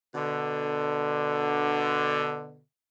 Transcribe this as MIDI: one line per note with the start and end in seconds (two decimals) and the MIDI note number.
0.15 2.61 47
0.15 2.61 50